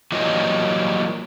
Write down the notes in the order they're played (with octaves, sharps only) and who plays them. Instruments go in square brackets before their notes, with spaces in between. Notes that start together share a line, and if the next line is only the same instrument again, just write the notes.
[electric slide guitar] E3 F#3 G3 A#3 F4 D#5